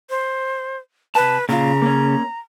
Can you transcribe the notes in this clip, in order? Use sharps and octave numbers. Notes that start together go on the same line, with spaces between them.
C5
C3 B4 A5
A#2 C#3 F4 A#5
A#3 C#4